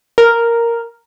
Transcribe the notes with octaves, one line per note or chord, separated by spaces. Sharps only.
A#4